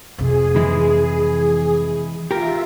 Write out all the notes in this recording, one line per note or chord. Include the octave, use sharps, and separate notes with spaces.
F2 C3 G#4
E3 G#3 E4
F4 G4 A#4 E5